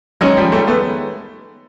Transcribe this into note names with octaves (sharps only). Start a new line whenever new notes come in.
D#3 F#3 G#3 C#4
F3 G3
G3 A3
A3 B3